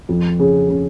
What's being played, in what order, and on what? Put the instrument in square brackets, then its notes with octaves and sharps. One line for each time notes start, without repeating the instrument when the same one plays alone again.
[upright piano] F2
C#3
C#3